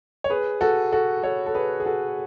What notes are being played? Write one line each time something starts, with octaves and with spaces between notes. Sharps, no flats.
C#5
G#4 B4
F#4 A4
F#4 A4
A4 C#5
A4
G#4 B4
G#4
F#4 A4